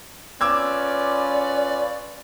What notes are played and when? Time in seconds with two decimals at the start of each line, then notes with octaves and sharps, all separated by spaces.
0.41 C#4 F4 B4 D5 D6 E6 G#6